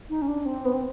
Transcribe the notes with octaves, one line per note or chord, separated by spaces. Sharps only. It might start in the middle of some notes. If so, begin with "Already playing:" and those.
D#4
C#4
D4
C4
B3
C4